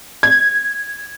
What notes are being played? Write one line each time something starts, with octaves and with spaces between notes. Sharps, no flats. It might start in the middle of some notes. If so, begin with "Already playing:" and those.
G#6